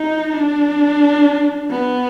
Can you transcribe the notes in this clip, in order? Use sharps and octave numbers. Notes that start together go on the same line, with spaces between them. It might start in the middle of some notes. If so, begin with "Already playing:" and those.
Already playing: D#4
D4
B3